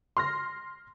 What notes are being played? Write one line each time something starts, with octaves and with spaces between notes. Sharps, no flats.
C6 F6 A#6